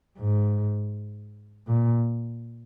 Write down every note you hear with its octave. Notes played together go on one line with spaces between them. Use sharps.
G#2
A#2